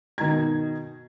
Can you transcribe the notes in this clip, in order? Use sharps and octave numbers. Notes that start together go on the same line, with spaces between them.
B2 D#3 D#4 A#5 G#6